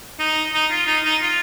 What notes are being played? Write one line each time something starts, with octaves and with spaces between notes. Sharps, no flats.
D#4
D#4
F4
D#4
D#4
F4